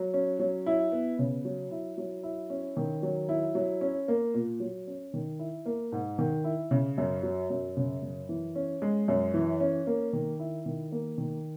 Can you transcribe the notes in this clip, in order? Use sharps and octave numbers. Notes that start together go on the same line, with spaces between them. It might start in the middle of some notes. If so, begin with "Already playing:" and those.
Already playing: F#3
C#4
F#3
E4
B3
C#3
F#3
E4
F#3
E4
C#4
D#3
F#3
E4
F#3
C#4
A#3
A#2
F#3
C#4
D#3
E4
A#3
G#2
D#3
E4
C#3
F#2
F#3
F#2
C#3
F#2
E3
C#4
G#3
F#2
E3
C#4
A#3
D#3
E4
D#3
A#3
D#3